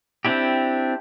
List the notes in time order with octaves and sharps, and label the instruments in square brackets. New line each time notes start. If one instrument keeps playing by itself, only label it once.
[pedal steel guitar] C4 D4 E4 G4